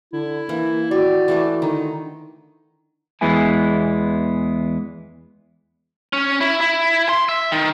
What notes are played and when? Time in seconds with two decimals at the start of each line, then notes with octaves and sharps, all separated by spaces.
0.13 D3 E4
0.49 E3 A#3
0.91 F#4 G4 D5
1.28 E3 A3 D4
1.62 D3 D#3 D#4
3.21 E2 E3 G#3 B3 E4 G#5
6.13 C#4
6.41 E4
6.61 E4
7.09 C6
7.29 E5
7.52 D#3